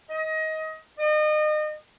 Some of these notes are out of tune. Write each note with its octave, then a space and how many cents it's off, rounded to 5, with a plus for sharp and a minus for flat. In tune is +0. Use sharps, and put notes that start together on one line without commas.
D#5 +20
D#5 -35